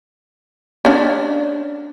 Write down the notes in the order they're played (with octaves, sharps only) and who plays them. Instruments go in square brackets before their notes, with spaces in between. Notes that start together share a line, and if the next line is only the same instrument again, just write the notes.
[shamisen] C#4 D4